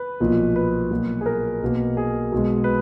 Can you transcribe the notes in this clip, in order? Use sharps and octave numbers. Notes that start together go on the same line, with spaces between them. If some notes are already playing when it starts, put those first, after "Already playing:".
Already playing: B4
B1 A#2 F3 A#3
B4
B1 A#2 F#3 A#3
G#4
A#4
B1 B2 A#3
G#4
B1 B2 G#3
B4